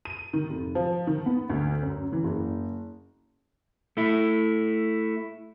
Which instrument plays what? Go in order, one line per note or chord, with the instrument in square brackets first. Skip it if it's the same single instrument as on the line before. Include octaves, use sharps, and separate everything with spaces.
[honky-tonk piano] D#7
D#3
F1
F3
D#3
B3
D2
F#2
E3
F#1
[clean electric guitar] A3 E4